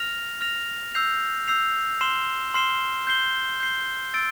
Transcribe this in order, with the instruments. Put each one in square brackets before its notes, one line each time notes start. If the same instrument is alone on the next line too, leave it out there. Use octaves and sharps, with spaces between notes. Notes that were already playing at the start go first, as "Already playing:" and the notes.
Already playing: [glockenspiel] F6 A#6 F7
F6 A#6 F7
E6 G6 C7 F7
E6 G6 C7 F7
C6 F6 C7 E7 G7
C6 F6 C7 E7 G7
G6 C7 G7
G6 C7 G7
E6 A6 D7